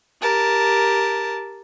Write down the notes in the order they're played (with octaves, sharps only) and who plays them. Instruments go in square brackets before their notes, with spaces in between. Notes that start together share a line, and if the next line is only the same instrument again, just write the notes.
[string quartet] G4 A#4 A5